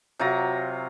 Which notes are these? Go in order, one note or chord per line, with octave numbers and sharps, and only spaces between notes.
C3 F#3 F4 A#5